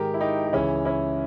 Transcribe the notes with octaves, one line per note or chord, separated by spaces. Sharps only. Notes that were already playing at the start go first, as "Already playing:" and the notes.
Already playing: G#2 D#3 G#3 G4 A#4
E4
D#4 G4
G4
C#2 C#3 E3 G#3 C#4 E4
C#4 E4